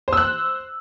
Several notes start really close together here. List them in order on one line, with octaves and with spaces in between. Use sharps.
C5 E6 F#6